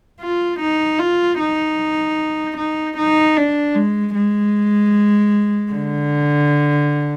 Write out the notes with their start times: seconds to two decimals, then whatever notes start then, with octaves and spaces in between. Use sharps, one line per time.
0.21 F4
0.59 D#4
0.99 F4
1.39 D#4
2.57 D#4
2.97 D#4
3.36 D4
3.75 G#3
4.15 G#3
5.73 D3